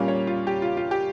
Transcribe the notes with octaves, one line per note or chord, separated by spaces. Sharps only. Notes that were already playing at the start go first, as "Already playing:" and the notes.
Already playing: A#2 G3 A#3 C#4 F5
C#5
F4
G4
F4
F4
G4